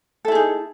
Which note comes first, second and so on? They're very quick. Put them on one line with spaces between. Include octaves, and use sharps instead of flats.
A4 E4 G#4 D#4